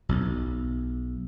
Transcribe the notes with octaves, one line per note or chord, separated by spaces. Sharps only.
B1